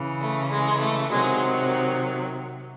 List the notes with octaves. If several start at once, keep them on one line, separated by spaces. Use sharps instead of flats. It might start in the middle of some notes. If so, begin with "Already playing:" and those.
Already playing: C#3 E3
A3
G#3
A3
C3 D#3 F#3 G#3